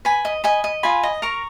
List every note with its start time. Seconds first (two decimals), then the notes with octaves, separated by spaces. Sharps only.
0.05 B4 G#5 B5
0.25 D#5
0.44 D#5 G#5 B5
0.64 D#5
0.83 F4 G#5 B5
1.03 D#5
1.22 A#4 A#5 C#6